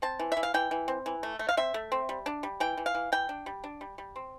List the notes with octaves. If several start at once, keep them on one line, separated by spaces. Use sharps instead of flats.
C4 A5
E3
E3 E5
F5
E3 G5
E3
C4
E3
A3
A3
F5
C4 E5
A3
C4
G3
D4
G3
E3 G5
E3
F5
E3
E3 G5
D4
G3
D4
G3
G3
C4